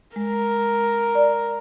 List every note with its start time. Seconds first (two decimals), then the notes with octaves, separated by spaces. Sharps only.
0.16 G#3 A#4
1.15 D5